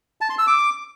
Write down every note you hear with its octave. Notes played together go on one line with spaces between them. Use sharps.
A5
C6
E6
D6